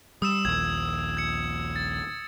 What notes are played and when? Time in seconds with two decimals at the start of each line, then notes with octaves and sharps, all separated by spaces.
0.22 G3 D#6 E6 E7
0.45 A#1 D#2 G#6
1.17 G#6 C#7
1.76 A6